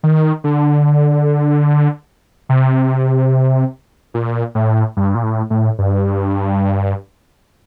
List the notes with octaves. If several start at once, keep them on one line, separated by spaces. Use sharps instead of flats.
D#3
D3
C3
A#2
A2
G2
A#2
A2
A2
G2